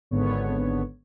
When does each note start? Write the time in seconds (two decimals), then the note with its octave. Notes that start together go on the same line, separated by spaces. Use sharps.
0.11 G#1 D3 B3 C#5